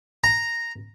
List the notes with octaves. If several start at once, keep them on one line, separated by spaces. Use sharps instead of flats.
A#5